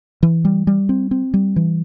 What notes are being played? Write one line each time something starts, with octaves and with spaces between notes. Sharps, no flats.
E3
G3
G3
C4
C4
G3
E3